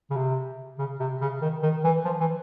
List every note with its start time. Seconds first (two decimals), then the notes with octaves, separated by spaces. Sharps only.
0.10 C#3
0.16 C3
0.79 C#3
1.00 C3
1.21 C#3
1.42 D#3
1.63 D#3
1.84 E3
2.05 F3
2.20 E3